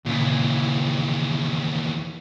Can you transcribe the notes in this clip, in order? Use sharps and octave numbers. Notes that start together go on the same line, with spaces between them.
D#2 A#2 C#3 E3